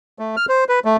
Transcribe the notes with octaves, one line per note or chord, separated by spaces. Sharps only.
A3
F6
C5
B4
A3